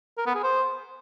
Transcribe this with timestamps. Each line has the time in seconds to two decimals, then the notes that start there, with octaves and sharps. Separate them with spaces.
0.18 A#4
0.26 B3
0.35 G#4
0.43 C5